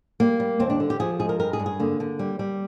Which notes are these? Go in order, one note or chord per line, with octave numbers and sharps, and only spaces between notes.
G3 A#3
G3
D#2 C4
D4
D3
G4
F3 G#4
G#3 G#4
A#4
G2 A#4
G#4
G2
G#4
D3 A#3
D3
G3
G3